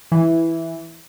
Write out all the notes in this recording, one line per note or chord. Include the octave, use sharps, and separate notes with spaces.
E3